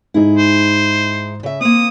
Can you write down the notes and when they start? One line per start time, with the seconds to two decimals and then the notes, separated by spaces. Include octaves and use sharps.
0.14 G#2 D#4 E4 G#4
0.37 C5
1.43 C#3 E5
1.61 A#3 C4 D#6